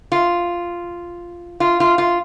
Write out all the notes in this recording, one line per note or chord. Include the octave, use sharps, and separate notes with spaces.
F4
F4
F4
F4